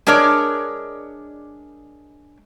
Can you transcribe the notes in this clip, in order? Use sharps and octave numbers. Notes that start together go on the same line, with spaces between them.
G#3 D4 A#4 C#5 D5